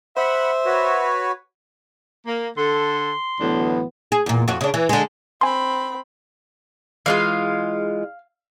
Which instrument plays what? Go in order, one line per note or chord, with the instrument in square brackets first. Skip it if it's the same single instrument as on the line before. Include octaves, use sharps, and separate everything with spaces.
[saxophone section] C5 E5 [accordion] F#5 B5
[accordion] F#4 B4 C#5
[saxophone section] A#3
[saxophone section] D3 A4 [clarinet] C6
[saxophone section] D2 A2 D4 [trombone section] E3 F#3 B3
[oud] G#4
E2 A#2
F2 F#4
C#3 D4
E3
D3 G#3
[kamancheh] C4 B5 [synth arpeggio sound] G#5 C6
[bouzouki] E3 G#3 F4 [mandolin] F5